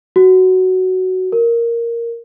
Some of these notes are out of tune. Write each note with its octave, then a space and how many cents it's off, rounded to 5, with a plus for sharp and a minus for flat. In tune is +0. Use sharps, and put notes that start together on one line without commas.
F#4 +10
A#4 +0